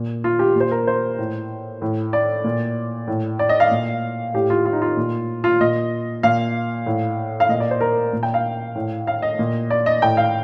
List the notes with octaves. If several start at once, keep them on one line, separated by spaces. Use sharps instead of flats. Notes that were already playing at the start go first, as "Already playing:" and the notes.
Already playing: A#2
F4
G4
A#2 C5
A#4
C5
A2
A2
D5
A#2
A2
D5
D#5
F5
A#2
A2 G4
F4
F4
D#4
F4
A#2
F4
A#2 D#5
A#2 F5
A2
F5
A#2 D#5
D5
C5
A#4
A#2
G5
F5
A2
F5
D#5
A#2
D5
D#5
A2 G5
F5